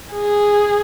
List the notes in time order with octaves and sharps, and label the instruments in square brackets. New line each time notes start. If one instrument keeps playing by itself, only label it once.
[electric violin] G#4